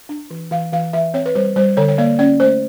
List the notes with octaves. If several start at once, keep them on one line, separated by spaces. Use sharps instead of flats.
D4
E3
E3 F5
E3 F5
E3 E5
C4 C#5
B4
G3 C5
G3 C5
D3 C#5
C#5
A#3 D5
C#4 D5
A3 C5